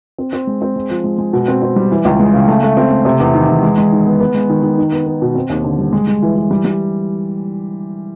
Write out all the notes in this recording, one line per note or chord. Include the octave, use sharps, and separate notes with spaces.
C4
C4
G#3
C4
G#3
F3
G#3
G#3
B2
C4
C4
G3
E3
C#2
G#3
C#3
A3
A3
C4
A3
C3
E2
D#3
E2
G#3
G#3
D#3
B3
B3
G#3
D#3
D#3
D#4
B3
B3
B2
C4
D#2
D3
G3
G#3
G#3
E3
E3
G3
G3